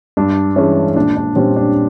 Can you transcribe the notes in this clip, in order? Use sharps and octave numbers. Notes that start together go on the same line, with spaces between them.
G2 D4
E3 G#3 C#4
A#1 D4
D4
A#2 G3 C4 C#4
D4